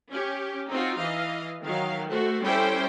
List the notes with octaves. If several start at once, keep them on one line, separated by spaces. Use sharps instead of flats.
C#4 G4
C4 D#4 F4 F#4
E3 D#5 F5
D#3 F#3 F5
A3 F#4 C5
G3 C#4 E4 A4 C5 G5